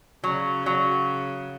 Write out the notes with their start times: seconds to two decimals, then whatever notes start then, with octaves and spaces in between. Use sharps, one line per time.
0.24 C#3 F#3
0.66 F#3